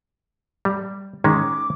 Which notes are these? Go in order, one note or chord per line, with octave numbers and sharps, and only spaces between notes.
G3
D#3 G#3 C#4 D6